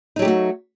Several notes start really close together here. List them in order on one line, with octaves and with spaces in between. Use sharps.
D#4 F#3 G4 A3 F#4